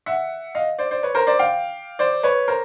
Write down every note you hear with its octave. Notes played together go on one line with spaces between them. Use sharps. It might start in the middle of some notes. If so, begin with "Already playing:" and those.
E5 F#5
D#5 F5
C5 D5
C5 D5
B4 C#5
A#4 C5
C5 D5
F5 G5
C5 D5
B4 C#5
A#4 C5